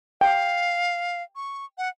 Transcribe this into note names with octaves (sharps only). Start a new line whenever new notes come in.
F5 G5
C#6
F#5